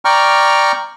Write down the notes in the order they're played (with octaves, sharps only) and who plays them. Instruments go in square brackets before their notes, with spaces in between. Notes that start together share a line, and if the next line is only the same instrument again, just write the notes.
[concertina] D5 G5 A#5 C#6 F6